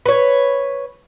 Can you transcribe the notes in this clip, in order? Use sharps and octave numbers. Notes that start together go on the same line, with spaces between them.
B4 C#5